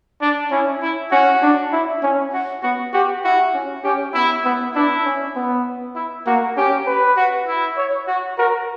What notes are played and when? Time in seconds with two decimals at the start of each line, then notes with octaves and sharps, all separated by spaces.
0.22 D4
0.51 C#4 E4
0.82 E4
1.11 C#4 F#4
1.42 D4
1.73 E4
2.02 C#4
2.33 F#4
2.63 B3 F#4
2.93 F#4 G4
3.24 E4 F#4
3.54 C#4
3.84 C#4 G4
4.14 B3 E4
4.45 B3
4.75 D4 E4
5.05 C#4
5.36 B3
5.96 E4
6.26 A#3 F#4
6.57 C#4 G4
6.87 B4
7.17 F#4
7.47 E4
7.77 C#5
8.07 F#4
8.38 F#4 A#4